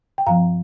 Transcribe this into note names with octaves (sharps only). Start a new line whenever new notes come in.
G5
G2 F3 C4 F5 A#5